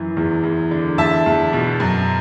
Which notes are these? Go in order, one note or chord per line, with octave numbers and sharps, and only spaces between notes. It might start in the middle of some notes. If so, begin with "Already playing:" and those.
Already playing: F#2 E3
E2
E2
D3
E2 E5 A5
E2
B2
F#2